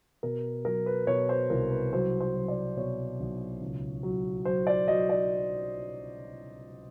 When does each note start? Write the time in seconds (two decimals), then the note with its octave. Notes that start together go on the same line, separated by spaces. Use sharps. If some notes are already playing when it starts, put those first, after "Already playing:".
0.23 B2 A#4
0.65 F#3 A#4
0.86 B4
1.07 B2 C#5
1.29 C5
1.50 C2 A#4
1.71 B4
1.93 F#3 C5
2.20 C5
2.35 F#3
2.48 D5
2.77 B2 C#5
3.20 B1
3.61 C#2
4.03 F#3
4.45 F#3 C5
4.67 D5
4.88 F#3 D#5
5.10 D5